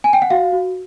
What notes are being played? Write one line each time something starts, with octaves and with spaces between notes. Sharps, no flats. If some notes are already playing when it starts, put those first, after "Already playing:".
G#5
G5
F#5
F#4 F5
F#4